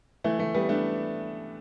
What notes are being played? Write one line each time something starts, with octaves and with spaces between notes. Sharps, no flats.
E3 A3
E3 A3
G3 B3
A3 D4